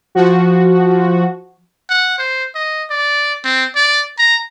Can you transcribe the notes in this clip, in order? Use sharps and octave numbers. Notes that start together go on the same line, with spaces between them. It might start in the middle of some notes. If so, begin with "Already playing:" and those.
F3 F#4
F#5
C5
D#5
D5
C4
D5
A#5